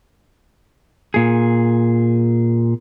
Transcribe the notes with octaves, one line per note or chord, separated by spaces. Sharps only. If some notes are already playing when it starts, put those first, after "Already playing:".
A#2 G#4